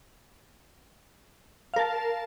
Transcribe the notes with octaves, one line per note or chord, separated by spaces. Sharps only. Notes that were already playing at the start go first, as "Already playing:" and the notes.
A#4 F5 A5